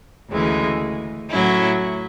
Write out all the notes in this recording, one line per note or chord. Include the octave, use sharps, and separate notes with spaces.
D2 C#3 E3 G#3
A2 F#3 C#4 E4